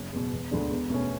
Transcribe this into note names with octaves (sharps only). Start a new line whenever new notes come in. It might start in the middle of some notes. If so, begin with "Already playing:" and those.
Already playing: F#1
E2 B2
E1
D2 D3 G#3 D4
E2
B2 A3 C#4